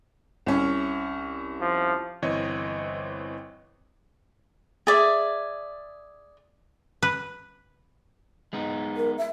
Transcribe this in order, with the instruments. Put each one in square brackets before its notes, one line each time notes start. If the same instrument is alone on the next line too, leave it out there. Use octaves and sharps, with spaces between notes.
[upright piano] C2 C#4
[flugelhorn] F3
[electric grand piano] G1 E3 C4 C#5 D#5
[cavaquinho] G#4 D5 E5
[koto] B4
[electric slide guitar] G#3 B3 D#4
[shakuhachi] A#4
E5